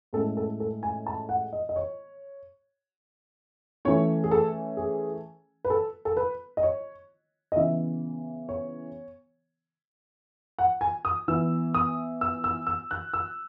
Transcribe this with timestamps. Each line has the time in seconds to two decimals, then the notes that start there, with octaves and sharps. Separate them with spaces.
0.13 A2 G#3 C#4 A4
0.37 A4
0.60 A4
0.83 G#5
1.06 A5
1.29 F#5
1.53 D#5
1.69 D#5
1.76 C#5
3.85 E3 A3 C#4 C#5
4.24 G#4
4.31 A4
4.77 G#4
5.65 B4
5.70 A4
6.05 A4
6.17 B4
6.57 D#5
6.63 C#5
7.52 D#5
7.56 C#3 E3 B3 E5
8.49 C#5
10.59 F#5
10.81 G#5
11.05 D#6
11.28 E3 B3 E6
11.74 D#6
12.21 E6
12.44 E6
12.67 E6
12.91 F#6
13.13 E6